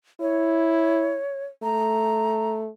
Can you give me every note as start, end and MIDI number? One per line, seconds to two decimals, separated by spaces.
0.21 1.18 64
0.21 1.45 73
1.63 2.68 57
1.63 2.52 82